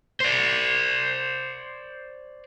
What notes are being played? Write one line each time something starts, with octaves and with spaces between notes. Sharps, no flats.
C5 D5